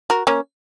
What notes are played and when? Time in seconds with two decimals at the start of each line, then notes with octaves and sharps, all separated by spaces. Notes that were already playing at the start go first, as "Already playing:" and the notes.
0.10 F#4 A#4
0.27 A#3 C#4